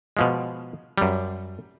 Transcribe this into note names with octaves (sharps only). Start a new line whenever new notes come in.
B2 F3 G#3
F#2 G3